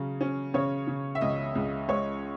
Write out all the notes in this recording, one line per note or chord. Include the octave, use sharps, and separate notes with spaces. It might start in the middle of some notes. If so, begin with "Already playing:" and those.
Already playing: C#3 F#3 C#4
C#4
C#3 C#5
C#3
E5
C#2 D#5
C#2
G#3 C#5